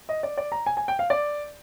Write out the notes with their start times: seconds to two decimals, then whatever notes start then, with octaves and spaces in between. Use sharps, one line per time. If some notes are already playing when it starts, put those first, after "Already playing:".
0.09 D#5
0.23 D5
0.38 D5
0.52 A#5
0.66 G#5
0.77 G#5
0.88 G5
0.99 F5
1.10 D5